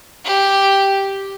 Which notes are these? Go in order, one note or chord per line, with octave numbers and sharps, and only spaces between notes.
G4